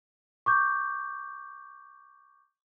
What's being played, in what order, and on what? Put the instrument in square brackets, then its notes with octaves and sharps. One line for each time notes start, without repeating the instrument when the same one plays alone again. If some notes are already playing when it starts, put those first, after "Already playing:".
[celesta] C#6 D6 G6